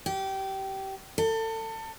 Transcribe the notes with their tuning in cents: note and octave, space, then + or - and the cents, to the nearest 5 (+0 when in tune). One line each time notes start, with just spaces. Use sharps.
G4 -20
A4 +30